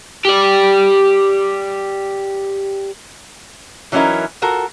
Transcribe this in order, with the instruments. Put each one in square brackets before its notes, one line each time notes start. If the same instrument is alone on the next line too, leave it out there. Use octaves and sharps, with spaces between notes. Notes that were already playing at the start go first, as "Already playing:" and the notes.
[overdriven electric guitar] G4 D5
[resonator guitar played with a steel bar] E3 F#3 C#4 D#4 E4 A#4
F4 F#4 A4 A#4